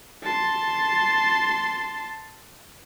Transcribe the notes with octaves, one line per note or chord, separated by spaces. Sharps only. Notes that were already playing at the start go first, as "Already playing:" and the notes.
A5 C6